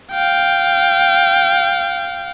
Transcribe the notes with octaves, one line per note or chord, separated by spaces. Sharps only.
F5 G5